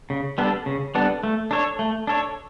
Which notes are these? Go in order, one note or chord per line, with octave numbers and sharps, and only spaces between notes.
C#3
G3 B3 D4 A4
C#3
G3 B3 D4 A4
A3
D4 A4 C#5
A3
D4 A4 C#5